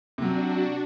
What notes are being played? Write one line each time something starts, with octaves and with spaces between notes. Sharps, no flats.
C3 F#3 D4 F#4